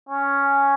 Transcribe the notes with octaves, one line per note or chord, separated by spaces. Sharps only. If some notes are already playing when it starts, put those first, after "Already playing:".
C#4